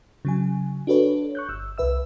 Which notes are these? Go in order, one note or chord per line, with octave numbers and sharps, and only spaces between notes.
C#3 F#3 G#5
D4 F#4 A4 B4 C#5
C#6 F#6 G6
G1 E6
C2 B4 E5 E6